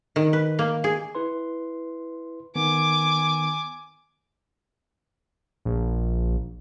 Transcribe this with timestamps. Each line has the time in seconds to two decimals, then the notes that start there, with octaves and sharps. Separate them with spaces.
0.16 D#3
0.33 B4
0.59 A#3
0.84 G#4
1.15 E4 B4 C6
2.56 D#3 B3 G#5 D6
5.65 A#1